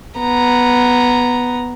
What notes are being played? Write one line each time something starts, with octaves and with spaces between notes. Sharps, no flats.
B3 A#5